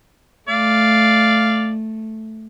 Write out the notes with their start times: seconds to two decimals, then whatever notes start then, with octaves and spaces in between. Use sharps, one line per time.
0.49 A3 D5 F5